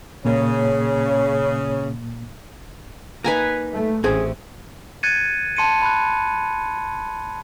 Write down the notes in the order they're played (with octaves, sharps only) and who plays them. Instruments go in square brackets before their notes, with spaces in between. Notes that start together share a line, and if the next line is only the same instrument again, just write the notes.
[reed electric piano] A#2 A#3 [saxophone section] C#3 [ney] C#5
[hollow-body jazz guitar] A#3 D#4 [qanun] B4 G#5 A#5
[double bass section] A3
[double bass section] A1 [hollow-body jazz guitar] E3 C4 C#4 [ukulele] G#4
[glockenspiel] F#6 G#6 A6 C#7 D#7
A5 C6 C#7 D#7
B5 F#6